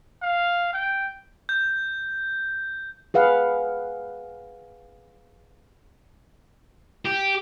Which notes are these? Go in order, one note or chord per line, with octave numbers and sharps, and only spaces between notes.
F5
G5
G6
G#4 B4 F5 F#5
G4